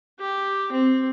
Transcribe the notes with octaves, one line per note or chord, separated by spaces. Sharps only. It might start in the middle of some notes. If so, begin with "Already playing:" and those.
G4
C4